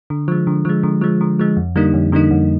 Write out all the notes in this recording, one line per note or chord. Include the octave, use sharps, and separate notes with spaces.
D3
F3 G#3
D3
F3 G#3
D3
F3 G#3
D3
F3 G#3
F2
D3 G3 A#3 D#4
F2
D3 G3 A#3 D#4
F2